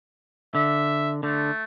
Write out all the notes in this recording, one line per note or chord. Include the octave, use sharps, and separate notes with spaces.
D3 E5
D3 A3